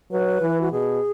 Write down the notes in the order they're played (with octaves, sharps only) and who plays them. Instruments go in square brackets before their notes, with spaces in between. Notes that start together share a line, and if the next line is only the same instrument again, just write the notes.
[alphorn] F#3 [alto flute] B4
[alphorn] E3
[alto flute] F#4
[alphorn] B2 [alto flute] G#4